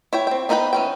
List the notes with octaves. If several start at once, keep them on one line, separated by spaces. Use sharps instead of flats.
E4 C#5 G5
C4 G5
B3 D#4 A#4 B4 G5
E3 C#4 G5